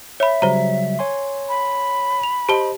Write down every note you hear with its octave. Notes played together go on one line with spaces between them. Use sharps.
C#5 E5 B5
C#3 F#3 G3 C5 A#5
C#5 G#5 C6
B5
F7
G4 C5 D#5 A5 G7